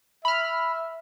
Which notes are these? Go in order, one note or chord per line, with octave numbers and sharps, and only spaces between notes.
E5 B5 F6